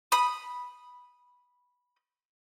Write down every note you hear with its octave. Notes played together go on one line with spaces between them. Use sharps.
B5 D#6